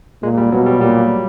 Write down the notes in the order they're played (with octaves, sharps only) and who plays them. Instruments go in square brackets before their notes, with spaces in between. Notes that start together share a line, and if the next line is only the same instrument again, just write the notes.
[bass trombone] A#2 [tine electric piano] G#3
[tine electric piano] G3
[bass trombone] B2 [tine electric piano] F#3
[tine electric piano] G3
[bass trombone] A#2 [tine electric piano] G3